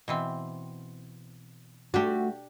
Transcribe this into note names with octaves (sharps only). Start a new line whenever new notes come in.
B2 E3 C4
A3 D4 F#4 G4